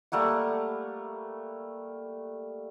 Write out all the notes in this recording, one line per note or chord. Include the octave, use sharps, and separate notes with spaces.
G3 A3 A#3 F#5